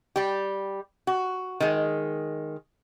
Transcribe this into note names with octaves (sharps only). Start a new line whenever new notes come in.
G3 G4
F#4
D#3 G#3